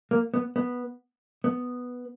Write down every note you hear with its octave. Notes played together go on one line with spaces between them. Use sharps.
A#3
B3
B3
B3